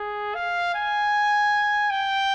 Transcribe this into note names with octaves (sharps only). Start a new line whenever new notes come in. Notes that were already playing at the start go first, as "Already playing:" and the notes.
Already playing: G#4
F5
G#5
G5